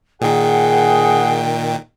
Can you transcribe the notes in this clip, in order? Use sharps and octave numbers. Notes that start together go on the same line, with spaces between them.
A#2 D#3 G#4 F#5 G5